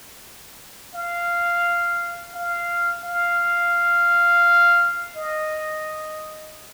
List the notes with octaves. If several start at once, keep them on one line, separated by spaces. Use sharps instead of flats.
F5
F5
F5
D#5